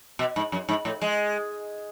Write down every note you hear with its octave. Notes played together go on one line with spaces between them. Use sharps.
B2
G#2
F#2
G#2
A2
G#3